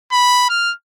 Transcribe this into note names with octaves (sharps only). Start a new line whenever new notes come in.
B5
F6